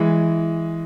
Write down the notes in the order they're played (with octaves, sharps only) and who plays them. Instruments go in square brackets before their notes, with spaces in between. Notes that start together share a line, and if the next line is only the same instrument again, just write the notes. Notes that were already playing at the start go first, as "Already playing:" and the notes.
Already playing: [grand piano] E3 G#3